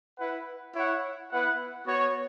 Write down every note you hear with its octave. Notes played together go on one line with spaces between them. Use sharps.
E4 B4 F#5
E4 C#5 F#5
B3 E4 B4 F#5
B3 F#4 C#5